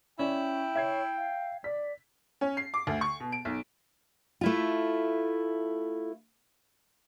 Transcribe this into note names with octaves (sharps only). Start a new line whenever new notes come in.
C#4 E4 D5 G5
C#5 E5 G#6 C7
F5
D5 B6
C#4
C7
D6
D2
C#6
B2
D7
B1
A3 E4 F4